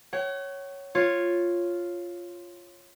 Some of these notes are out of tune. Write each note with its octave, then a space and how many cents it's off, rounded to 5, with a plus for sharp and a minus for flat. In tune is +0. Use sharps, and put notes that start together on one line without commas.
C#5 +0 F#5 +45
F4 +0 C#5 -10